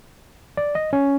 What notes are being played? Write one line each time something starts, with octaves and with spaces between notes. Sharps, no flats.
D5
D#5
C#4